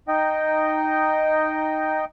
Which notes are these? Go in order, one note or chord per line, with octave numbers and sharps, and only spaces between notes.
D#4 D#5 G5